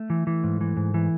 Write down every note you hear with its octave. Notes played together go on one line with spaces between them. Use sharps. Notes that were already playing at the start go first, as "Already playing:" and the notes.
Already playing: A3
E3
E3
G#2
E3
G#2
E3